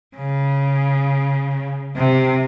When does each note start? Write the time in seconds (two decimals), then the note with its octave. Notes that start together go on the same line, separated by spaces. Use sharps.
0.16 C#3
1.96 C3